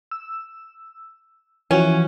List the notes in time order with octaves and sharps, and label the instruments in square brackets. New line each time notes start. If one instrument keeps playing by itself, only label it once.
[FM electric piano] E6
[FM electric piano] E3 F3 F#4 [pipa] C#4